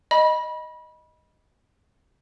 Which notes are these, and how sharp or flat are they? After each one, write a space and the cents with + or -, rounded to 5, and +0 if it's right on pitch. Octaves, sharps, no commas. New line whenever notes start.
D#5 +0 B5 -25